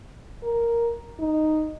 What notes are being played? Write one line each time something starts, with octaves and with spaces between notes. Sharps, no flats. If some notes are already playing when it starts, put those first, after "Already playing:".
A#4
D#4